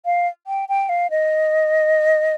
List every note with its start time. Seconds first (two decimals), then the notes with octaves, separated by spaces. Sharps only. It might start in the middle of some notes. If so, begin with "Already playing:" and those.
0.05 F5
0.47 G5
0.69 G5
0.89 F5
1.10 D#5